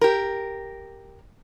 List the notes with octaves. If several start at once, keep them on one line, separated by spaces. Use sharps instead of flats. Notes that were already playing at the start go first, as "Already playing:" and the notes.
G4 A#4